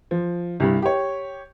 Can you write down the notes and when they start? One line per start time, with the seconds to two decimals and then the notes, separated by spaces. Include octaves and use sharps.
0.11 F3
0.60 C2 G2
0.82 G4 C#5